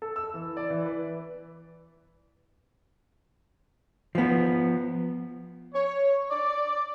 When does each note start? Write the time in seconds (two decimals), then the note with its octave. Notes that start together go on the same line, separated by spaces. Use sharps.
0.02 A4
0.16 E6
0.34 E3
0.57 D5
0.70 E3
0.85 B4
4.15 F3 B3
5.73 C#5
6.30 D5